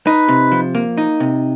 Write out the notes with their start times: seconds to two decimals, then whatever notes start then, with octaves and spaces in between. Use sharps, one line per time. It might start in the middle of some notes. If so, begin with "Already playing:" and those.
0.06 D#4 B4
0.28 C3
0.52 F3
0.75 A#3
0.97 D#4
1.20 C3